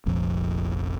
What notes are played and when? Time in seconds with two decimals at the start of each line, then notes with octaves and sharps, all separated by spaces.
0.06 F1 A#1 F2